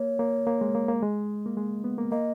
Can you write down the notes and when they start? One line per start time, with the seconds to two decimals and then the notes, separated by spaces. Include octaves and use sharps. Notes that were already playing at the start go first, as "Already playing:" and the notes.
Already playing: A#3 C#5
0.19 A#3
0.47 A#3
0.61 G#3
0.75 A#3
0.89 A#3
1.02 G#3
1.46 A#3
1.57 G#3
1.84 B3
1.98 A#3
2.11 A#3 D#5